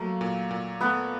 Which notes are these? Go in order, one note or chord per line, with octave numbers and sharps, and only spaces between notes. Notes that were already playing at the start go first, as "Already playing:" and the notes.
Already playing: F#3 A3 A#3
A#2
A#2
A3 B3